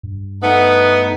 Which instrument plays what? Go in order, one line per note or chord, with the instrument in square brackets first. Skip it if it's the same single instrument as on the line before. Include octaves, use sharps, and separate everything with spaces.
[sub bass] G2
[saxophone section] A3 B3 [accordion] D#4 F#5